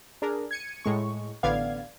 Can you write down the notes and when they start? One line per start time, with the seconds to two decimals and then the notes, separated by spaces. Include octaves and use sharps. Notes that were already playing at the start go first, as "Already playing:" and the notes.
0.22 D4 G#4 A#4
0.51 G#6 C#7 D#7
0.84 A2 G#3 C#6
1.43 A1 D3 B3 D5 F5 G#6